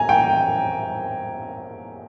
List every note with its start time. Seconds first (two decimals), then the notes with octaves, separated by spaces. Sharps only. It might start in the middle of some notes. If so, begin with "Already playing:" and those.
Already playing: G#5 A#5
0.09 G5